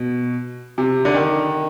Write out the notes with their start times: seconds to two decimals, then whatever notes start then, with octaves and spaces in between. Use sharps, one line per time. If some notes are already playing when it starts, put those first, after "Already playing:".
Already playing: B2
0.78 C3
1.05 D3
1.14 D#3